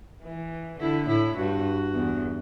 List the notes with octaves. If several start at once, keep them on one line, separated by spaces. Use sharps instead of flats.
E3
D3 E4
A2 E4
G2 F#4
E2